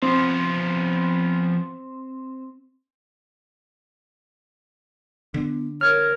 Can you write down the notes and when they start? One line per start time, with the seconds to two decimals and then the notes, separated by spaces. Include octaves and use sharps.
0.03 F3 B3 C4
5.34 D3 B3
5.81 A#4 C#5 F6 G#6